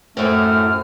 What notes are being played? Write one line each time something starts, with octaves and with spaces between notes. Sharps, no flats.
F#2 A2 A3 C4 F6